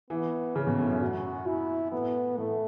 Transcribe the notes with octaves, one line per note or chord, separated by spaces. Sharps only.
E3 B3
C#3 C#4
B2
A2
F#2
F#4
E4
A2 B3
A2 A3